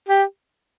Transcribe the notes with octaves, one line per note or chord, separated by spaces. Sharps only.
G4